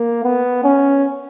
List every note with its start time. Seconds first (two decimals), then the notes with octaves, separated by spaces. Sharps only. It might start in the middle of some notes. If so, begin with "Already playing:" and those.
Already playing: A#3
0.24 B3
0.64 C#4